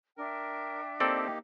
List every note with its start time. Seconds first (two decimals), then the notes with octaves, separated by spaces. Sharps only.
0.18 D4 A#4 E5 G5
1.00 A#3 C4 D#4 G4 A4 D5